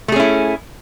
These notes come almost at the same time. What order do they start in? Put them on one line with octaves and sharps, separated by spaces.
A3 G#4 C#4 E4